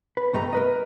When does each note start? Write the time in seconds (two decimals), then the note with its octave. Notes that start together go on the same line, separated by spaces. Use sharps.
0.17 B4
0.33 C2 G2 G3 A3 D#5 A#5
0.53 A#4 B4 D#5